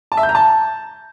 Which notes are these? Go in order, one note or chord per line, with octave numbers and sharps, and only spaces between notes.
A5
E5
G6
A#5
A5